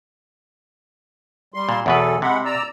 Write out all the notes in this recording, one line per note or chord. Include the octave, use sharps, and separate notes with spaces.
G3 C6
A#2
E2 B2 F#3 A4 B4
C3 G#3 F#5 B5
D5 A#5 E6